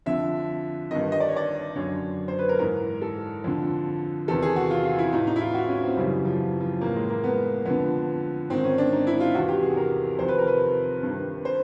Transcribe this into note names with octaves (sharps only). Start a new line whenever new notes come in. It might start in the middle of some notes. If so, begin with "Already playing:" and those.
F2 D3 E5
G2 D#3 D#5
D#5
D5
C#5
D5
F#2 D3 C#5
C5
B4
A#4
G#2 E3 A#4
A4
F2 D3
E2 C3 D#3 A4
G#4
F#4
F4
F4
E4
A2 E3 D#4
D#4
E4
F4
F#4
C#4
C4
F#2 C#3 E3 G3
F3
F3
F3
A2 E3 A#3
G#3
A#3
B3
F2 D3 B3
G#2 D#3 C4
C#4
D4
D#4
E4
F4
E2 C3 E3 F#4
G4
G#4
A#4
F2 C3 D#3 C5
B4
A#4
B4
G2 D#3
C5